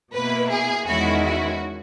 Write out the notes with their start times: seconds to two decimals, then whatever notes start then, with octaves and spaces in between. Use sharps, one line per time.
0.14 B2 A#3 E4 B4
0.50 G#4
0.87 E2 D#3 G#3 C#4 E4 F#4
1.24 F#4